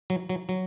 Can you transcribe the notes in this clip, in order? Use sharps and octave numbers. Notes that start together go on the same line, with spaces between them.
F#3
F#3
F#3